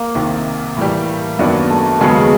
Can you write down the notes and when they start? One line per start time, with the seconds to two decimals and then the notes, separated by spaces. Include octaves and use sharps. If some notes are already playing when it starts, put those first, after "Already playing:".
Already playing: A#3
0.15 C2 C3 D#3
0.77 A2 E3 G3
1.38 F#2 D#3 F#3 A#3 B3 D4
1.70 A3
2.00 D#2 C#3 F#3 G#3 B3